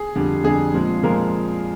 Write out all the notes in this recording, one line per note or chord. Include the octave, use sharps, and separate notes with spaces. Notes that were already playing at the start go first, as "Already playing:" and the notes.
Already playing: G#4
F2 D3 G3
F2 D3 G3 G#4
A#2 F3 G#3 C4
A#2 F3 G#3 C4 A#4